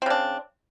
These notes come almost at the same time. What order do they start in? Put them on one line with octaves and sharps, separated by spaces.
C4 C#3 D4